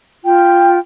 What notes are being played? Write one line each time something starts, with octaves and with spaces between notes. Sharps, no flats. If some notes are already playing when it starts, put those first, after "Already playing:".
F4 G5